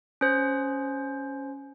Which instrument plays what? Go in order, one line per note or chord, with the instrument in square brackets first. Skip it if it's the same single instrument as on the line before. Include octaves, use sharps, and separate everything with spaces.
[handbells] C#4 C5